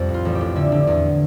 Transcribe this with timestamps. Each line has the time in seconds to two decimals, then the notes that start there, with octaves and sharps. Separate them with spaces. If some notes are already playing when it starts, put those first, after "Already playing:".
Already playing: C2 F2
0.09 A2
0.14 F4
0.25 A1
0.35 G4
0.41 A2
0.56 D3 E5
0.72 D3
0.87 E2